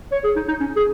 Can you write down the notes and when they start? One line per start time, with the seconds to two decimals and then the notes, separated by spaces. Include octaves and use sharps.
0.12 C#5
0.24 G#4
0.36 D#4
0.48 D#4
0.60 C#4
0.76 G#4